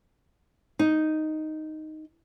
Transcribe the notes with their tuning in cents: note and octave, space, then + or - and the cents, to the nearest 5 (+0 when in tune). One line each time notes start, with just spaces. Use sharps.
D#4 +0